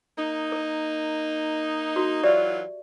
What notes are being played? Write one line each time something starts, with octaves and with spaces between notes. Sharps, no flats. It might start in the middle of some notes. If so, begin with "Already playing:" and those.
A#3 D#4
A#4
F#4
E3 F#3 F4 G4 D5 E5